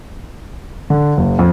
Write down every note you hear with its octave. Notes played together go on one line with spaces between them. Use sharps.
D3
F#1
F2